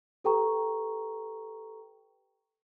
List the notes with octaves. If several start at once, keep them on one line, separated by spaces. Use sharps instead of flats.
G4 A4 B4 G5 A#5 C#6